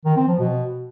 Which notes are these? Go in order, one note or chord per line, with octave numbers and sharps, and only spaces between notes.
D#3
C4
F3
B2